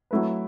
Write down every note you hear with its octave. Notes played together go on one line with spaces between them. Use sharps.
F#3 A3 E4 B4